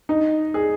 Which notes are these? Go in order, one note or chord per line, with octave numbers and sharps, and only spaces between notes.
D#4
G#4